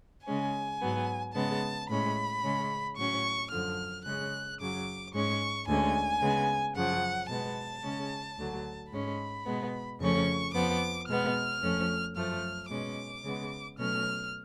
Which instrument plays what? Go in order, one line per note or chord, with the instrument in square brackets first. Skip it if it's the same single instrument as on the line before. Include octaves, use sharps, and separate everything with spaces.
[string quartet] C#3 G#3 C#4 G#5
G#2 F#3 B3
C#3 G#3 B3 A5
A2 G#3 C#4 B5
C#3 G#3 C#4
A2 F#3 C#4 C#6
F#2 D3 F3 F6
C#3 G#3 C#4 F#6
F#2 C#3 F#3 D6
G#2 G#3 C#4 C#6
D2 D3 G#3 C#4 G#5
C#3 G#3 B3
F#2 C#3 F3 F#5
B2 G#3 B3 A5
C#3 G#3 C#4
D2 D3 F#3
G#2 G#3 C#4 B5
B2 G#3 B3
F2 C#3 F3 A3 C#4 C#6
F2 F3 B3 D6
B2 G#3 B3 F6
F2 F3 A3 C#4
F#2 F3 A3 F6
B2 G#3 C#4 D6
C#3 G#3 B3
B2 F#3 A3 C#4 F6